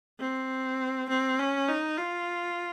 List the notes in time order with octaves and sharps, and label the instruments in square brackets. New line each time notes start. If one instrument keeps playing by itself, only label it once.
[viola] C4
C4
C#4
D#4
F4